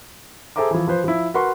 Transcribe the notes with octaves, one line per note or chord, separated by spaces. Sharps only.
G#4 A4 C5 E5 A#5 D6
E3 F3
F3 B4 C5
F3 E4
F#4 A#4 B4 F#5 C6 C#6